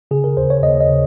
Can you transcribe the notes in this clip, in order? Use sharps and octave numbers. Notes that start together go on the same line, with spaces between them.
C#3 G#4
A#4
D#2 C5
C#5
D#2 D#5
D#5
C#3